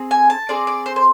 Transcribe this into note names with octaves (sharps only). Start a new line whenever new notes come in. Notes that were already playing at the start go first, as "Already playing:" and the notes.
Already playing: C4 G#4
G#5
A5
C4 G#4 D5
D5
C5
C5